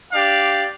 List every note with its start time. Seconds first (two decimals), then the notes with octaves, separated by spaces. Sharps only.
0.12 D4 G4 D5 F5